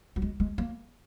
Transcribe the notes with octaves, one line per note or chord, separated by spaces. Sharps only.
F#3
G#3
G#3
A#3